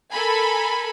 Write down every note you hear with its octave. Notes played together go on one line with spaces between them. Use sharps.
A4 A#4 G#5 B5